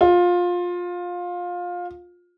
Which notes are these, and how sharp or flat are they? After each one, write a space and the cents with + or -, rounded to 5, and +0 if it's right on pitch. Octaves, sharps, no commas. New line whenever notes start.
F4 +20